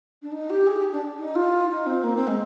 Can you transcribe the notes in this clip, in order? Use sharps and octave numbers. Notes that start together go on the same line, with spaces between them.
D4
D#4
G4
G#4
G4
D4
D#4
F4
D#4
C4
A#3
C4
G#3